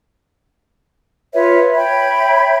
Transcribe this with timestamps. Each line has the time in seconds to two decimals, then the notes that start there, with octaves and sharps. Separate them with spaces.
1.34 F4 B4 C#5 E5
1.74 C#5 E5 G5 B5